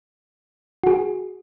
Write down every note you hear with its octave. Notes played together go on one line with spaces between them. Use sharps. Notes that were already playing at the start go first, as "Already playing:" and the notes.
F#4 G#4